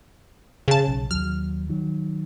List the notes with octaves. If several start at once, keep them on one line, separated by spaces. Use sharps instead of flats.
C#3 A5
B1
D#2 F#3 F6
D#3 F#3